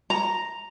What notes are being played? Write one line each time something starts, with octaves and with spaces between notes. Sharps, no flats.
A#5